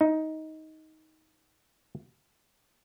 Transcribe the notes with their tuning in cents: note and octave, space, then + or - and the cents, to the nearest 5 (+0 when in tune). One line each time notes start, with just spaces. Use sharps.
D#4 +15